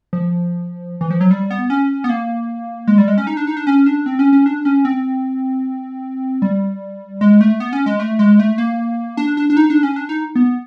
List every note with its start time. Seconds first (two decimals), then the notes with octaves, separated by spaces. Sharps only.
0.13 F3
1.01 E3
1.10 F3
1.21 F#3
1.31 G3
1.51 B3
1.70 C#4
2.04 B3
2.09 A#3
2.88 G#3
2.98 G3
3.08 G#3
3.18 C#4
3.27 D#4
3.37 D4
3.47 D#4
3.57 D4
3.67 C#4
3.86 D4
4.06 C4
4.19 C#4
4.33 C#4
4.46 D4
4.65 C#4
4.85 C4
6.42 G3
7.21 G#3
7.41 A3
7.60 B3
7.73 C#4
7.86 G#3
8.00 A3
8.19 G#3
8.39 A3
8.58 A#3
9.17 D4
9.37 D4
9.50 D4
9.57 D#4
9.70 D4
9.83 C#4
9.96 D4
10.09 D#4
10.35 B3